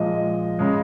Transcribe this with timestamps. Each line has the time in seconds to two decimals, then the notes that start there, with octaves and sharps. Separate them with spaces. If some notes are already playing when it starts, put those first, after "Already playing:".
Already playing: A#2 F3 G#3 D#5
0.59 C#3 G#3